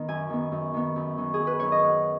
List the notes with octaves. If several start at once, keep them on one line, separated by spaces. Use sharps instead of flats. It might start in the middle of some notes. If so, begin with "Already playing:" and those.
Already playing: D#3 B3
F#2 G#5
D#3 B3
F#2
D#3 B3
F#2
D#3 F#3 C#4
G#4
F#2
B4
D#3 F#3 C#4 C#5
D#5
F#2 F#5